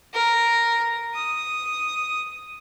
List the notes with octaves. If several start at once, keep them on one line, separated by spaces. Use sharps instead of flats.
A#4
D#6